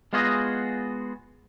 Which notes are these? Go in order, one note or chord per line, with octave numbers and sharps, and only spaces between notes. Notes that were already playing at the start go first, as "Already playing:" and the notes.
G#3 B3 F4 F#4 G#4 D#5